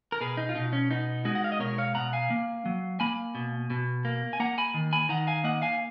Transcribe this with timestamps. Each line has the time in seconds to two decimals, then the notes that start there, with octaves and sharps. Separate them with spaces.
0.12 A#4
0.21 B2 G#4 B4
0.37 D#4
0.49 F4
0.55 B2 D#4
0.73 C#4
0.91 B3 D#4
1.25 G#3 D#4 F#4
1.35 F#5
1.44 F5
1.52 D#5
1.60 B2 A#4 C#5
1.78 C#5 F5
1.95 B2 F#5 A#5
2.13 F5 G#5
2.30 A#3
2.66 F#3
3.00 A#3 G#5 B5
3.35 B2
3.70 B2
4.05 A#3
4.33 G#5
4.40 A#3 F#5 A#5
4.58 G#5 B5
4.74 D#3
4.93 G#5 B5
5.09 D#3 F#5 A#5
5.27 F5 G#5
5.44 A#3 D#5 F#5
5.62 F5 G#5